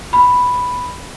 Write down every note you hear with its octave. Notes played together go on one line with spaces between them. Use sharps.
B5